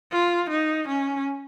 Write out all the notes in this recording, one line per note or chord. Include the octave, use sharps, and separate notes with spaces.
F4
D#4
C#4